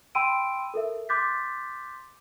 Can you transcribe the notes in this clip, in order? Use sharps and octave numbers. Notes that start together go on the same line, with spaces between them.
G5 B5 C6 E6 D7 D#7
A4 A#4 E5
C6 D6 F#6 G6 A6 B6